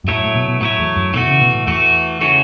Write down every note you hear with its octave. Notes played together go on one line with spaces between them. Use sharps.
F#2
A2 F#3 A3 E4 C#5
A2
B2
B2
A2 F#3 A3 E4 C#5
E2
F#2
B2 E3 A3 F#4
C#3
B2
A2
E2 E3 A3 F#4
C#3 E3 A3 F#4 C#5